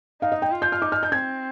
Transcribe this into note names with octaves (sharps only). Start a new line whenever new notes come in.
D#4 F5
D#5
G5
F4
G6
F6
D#4 D6
F6
G6
C4 G#6